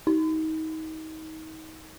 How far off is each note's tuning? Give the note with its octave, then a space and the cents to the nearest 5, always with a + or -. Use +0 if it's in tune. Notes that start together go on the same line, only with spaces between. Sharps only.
D#4 +30